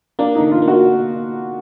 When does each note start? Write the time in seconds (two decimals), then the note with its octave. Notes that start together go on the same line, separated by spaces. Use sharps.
0.19 A#3 D4
0.35 D#4
0.40 D3
0.52 F4
0.62 A#3
0.68 F#4